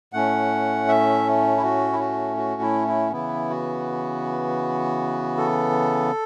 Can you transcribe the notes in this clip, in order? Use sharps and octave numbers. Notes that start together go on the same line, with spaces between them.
A2 A3 C#4 F#5
E5
E4
F#4
E4
F#4
F#4
E4
E4
C#3 E3 B3 E4
F#4
A4